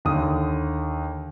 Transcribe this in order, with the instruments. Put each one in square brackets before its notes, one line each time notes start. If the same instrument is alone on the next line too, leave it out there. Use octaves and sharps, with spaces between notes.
[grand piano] D#2 D3 D#6